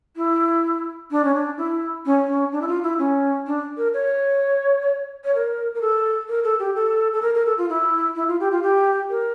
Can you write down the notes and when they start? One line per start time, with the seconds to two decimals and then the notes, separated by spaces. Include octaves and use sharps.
0.17 E4
1.11 D4
1.25 C#4
1.34 D4
1.58 E4
2.06 C#4
2.26 C#4
2.52 D4
2.62 E4
2.68 F4
2.83 E4
2.99 C#4
3.47 D4
3.77 A#4
3.94 C#5
5.24 C#5
5.35 A#4
5.75 A#4
5.81 A4
6.28 A#4
6.44 A4
6.59 G4
6.75 A4
7.13 A4
7.22 A#4
7.35 A#4
7.46 A4
7.58 F4
7.69 E4
8.16 E4
8.28 F4
8.40 G4
8.51 F4
8.63 G4
9.10 A#4